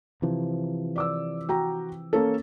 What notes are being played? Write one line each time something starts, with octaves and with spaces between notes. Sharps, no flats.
C3 E3 F3
D5 D6 E6
F#4 G5 A#5
A#3 C#4 A4